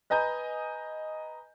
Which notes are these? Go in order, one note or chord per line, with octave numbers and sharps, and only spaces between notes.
B4 D#5 G#5 A#5 G6